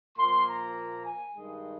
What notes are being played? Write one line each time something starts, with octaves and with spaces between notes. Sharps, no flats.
A#2 F3 A#3 C6
A#5
G#5
G2 D#3 G#3